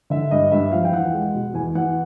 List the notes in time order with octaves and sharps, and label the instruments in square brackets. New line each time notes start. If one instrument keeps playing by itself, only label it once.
[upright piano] D3 E5
G2 D#5
G2 E5
F3 F5
G5
E2 F#5
G#3
B2
E2 G#5
E2 F#5